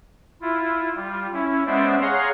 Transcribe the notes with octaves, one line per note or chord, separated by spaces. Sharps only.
E4 F4
G3 F4
C#4 E4
G#3 B3 C#4 C5 D5 E5
G#4 C#5 F5 F#5 A#5 C6